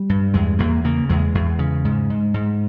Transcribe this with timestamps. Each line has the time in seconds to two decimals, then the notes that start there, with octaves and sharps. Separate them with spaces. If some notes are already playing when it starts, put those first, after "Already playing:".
Already playing: G3
0.09 G2
0.34 E2 G#3
0.59 E2 A#3
0.84 C#3 A#3
1.09 E2 G#3
1.35 E2
1.59 C#3
1.85 G#2
2.10 G#2
2.34 G#2